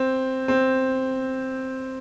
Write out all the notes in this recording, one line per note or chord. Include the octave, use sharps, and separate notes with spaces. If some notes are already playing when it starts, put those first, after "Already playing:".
Already playing: C4
C4